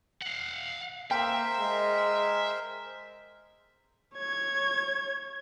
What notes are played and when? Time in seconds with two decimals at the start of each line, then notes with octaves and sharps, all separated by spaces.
0.21 F5 F#5
1.11 A#3 A#4 C5 E5 G5
1.60 G#3
4.16 C#5 G#6